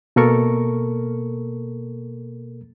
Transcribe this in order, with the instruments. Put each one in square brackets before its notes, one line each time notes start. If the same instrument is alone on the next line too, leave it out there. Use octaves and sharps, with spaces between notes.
[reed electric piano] B2 A#3 A4 A#4 C#6